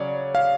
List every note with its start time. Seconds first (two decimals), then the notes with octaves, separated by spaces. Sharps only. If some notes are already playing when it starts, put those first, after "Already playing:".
Already playing: C#3 F#3 C#5 D5
0.35 F5